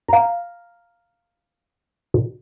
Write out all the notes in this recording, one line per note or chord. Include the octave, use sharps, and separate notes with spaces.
F5 A#5